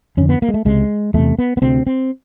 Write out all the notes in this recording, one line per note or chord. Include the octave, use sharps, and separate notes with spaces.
F2 D3 C#4
B3
A#3
G#3
A3
C#2 C3 G#3
E2 C3 A3
B3
B3
D2 C3 C4
C4